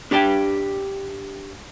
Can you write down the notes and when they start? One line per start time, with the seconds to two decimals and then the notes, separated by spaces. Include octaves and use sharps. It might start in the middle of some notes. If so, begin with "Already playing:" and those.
0.11 D4 G4 D5 G5